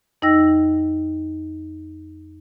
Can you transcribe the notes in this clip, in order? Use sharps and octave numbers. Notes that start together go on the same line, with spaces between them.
F2 D#4 D#5 G5 E6 A#6